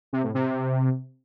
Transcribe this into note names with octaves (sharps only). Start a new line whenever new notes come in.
C3
A2
C3